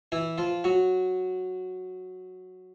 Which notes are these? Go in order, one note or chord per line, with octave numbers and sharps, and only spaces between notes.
E3 E4
F3 F4
F#3 F#4